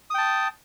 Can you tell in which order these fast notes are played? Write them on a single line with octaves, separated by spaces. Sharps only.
D#6 G5 A5